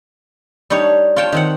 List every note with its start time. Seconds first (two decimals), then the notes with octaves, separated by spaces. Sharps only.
0.70 G3 D4 D#4 C#5
1.16 F4 C#5 G5 A5
1.32 D#3 C4 F#5